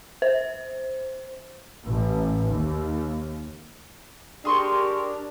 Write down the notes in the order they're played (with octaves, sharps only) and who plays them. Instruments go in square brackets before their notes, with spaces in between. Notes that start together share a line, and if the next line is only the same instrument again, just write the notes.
[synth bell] C5
[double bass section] A1
D#2
[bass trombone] D4 [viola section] G4 A#4 [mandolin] G#4 C6 C#6